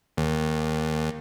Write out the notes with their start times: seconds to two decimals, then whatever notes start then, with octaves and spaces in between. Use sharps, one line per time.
0.17 D#2